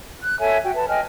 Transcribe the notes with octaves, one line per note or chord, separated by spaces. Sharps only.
F#6
A4 C#5 E5 G#5
F#4 G5
B4 A5
D#5 G5 G#5 F6